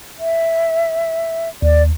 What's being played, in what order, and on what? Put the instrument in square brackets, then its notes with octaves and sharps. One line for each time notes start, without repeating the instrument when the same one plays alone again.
[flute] E5
[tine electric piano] D#2 [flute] D5